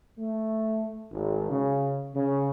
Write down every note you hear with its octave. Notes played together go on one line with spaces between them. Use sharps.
A3
G#1
C#3
C#3